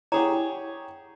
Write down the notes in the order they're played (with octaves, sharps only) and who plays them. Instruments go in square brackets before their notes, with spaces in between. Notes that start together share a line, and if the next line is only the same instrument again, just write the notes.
[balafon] E4 F#5 [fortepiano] G4 G#4 C#5 [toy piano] A#5